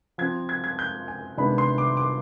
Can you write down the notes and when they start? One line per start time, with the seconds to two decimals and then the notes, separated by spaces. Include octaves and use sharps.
0.18 F3 C4 G#6
0.49 G#6
0.64 G#6
0.79 G6
1.08 G#5
1.37 C3 D#3 G#3 B3 D4 B5
1.58 C6
1.78 D6
1.97 D6